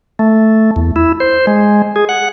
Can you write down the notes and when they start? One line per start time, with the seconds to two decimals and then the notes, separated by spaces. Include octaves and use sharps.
0.19 A3
0.76 E2
0.96 E4
1.20 C5
1.47 G#3
1.96 G#4
2.09 F#5